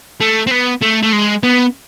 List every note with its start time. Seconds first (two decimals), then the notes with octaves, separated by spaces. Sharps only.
0.20 A3
0.47 C4
0.51 B3
0.81 A3
1.02 A3
1.13 G#3
1.43 B3